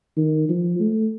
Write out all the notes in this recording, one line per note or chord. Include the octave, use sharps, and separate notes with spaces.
D#3
F3
A3